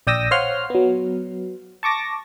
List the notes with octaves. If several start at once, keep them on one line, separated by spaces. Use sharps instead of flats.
A#1 D5 G5 D#6 E6 A#6
C5 C#5 F5 F#5 C6 F6
F#3 B3
A5 C#6 D6 A#6